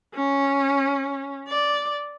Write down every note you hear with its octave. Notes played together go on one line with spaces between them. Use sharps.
C#4
D5